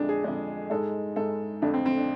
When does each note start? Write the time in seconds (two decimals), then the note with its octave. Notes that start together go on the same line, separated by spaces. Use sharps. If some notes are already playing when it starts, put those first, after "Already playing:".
Already playing: F2 D3 G#3 D4
0.09 G#4
0.24 F2 D3 G#3
0.70 G#2 G#3 A4
1.16 G#2 G#3 A4
1.62 F2 D3 F3 A3 D4
1.74 C4
1.86 C4
1.97 D4